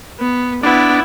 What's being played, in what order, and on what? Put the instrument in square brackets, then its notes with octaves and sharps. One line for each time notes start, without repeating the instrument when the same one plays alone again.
[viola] B3
[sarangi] B3 [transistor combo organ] D4 [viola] E4